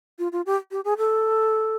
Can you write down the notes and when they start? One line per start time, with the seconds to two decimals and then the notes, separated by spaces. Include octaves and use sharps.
0.19 F4
0.32 F4
0.46 G4
0.71 G4
0.85 G#4
0.98 A4